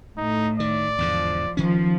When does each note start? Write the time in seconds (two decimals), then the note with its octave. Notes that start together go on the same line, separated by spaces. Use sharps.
0.17 A2 D#4
0.60 D#3 D5
0.98 E2 G#2 D3 F3
1.57 D#3 F3 C#4